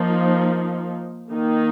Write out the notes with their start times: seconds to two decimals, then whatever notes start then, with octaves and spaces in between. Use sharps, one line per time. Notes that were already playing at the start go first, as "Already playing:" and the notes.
Already playing: F3 A#3 D#4
1.32 D#3 A#3 D#4